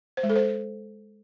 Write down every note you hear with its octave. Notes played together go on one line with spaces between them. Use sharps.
C5
G#3
A4
C5